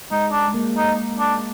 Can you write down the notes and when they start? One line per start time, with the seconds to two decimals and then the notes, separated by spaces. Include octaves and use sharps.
0.11 G#3 D#4
0.32 D4
0.48 G#3
0.54 A#3
0.77 D#4
1.19 D4